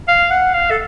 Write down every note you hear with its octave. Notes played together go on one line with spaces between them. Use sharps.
F5
F#5
F5
A4